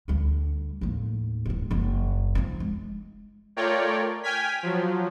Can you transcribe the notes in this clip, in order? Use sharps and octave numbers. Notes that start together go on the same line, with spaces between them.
D2 G3
D#2 A2
D1 G2
F#1 F#2
F3 D#4
G#3
A3 F4 A#4 C#5 D5 G5
G5 G#5 F6 G#6 B6
F3 F#3